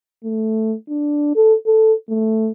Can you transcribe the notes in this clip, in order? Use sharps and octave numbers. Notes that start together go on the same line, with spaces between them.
A3
D4
A4
A4
A3